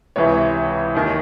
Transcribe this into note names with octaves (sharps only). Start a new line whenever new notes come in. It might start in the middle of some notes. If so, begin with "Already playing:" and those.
C#2 C3 E3 C#5
D#2 D#3